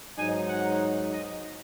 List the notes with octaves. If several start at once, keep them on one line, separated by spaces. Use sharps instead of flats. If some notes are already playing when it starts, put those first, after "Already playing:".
G#2 F#3 D#4 G#5
F#5
D#5